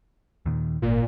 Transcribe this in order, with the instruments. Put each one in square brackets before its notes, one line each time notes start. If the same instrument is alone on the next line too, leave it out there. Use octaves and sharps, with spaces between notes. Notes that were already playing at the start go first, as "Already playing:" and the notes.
[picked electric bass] D#2 A#2 D#3
[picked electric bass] G#1 [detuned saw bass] A#2